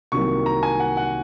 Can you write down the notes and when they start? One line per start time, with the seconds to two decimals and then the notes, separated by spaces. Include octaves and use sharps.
0.12 C2 C3 D#3 F#3 A#3 C#6
0.46 A#5
0.63 G#5
0.80 F#5
0.97 F#5